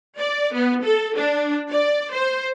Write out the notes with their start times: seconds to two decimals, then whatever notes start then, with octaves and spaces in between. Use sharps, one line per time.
0.18 D5
0.53 B3
0.84 A4
1.17 D4
1.72 D5
2.14 C5